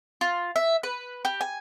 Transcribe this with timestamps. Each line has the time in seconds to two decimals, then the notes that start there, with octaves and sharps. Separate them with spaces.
0.21 F4
0.56 E5
0.83 B4
1.25 G4
1.41 G#5